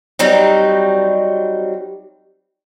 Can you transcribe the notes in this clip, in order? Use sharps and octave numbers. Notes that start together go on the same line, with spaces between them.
F#3 G3 C4 D#4